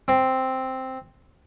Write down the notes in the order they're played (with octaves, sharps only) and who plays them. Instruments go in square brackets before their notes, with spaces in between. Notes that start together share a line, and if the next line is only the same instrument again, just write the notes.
[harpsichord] C4